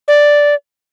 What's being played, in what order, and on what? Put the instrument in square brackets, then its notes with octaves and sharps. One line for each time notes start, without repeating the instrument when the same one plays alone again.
[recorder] D5